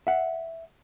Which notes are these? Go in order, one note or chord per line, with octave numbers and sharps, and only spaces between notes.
E5 F#5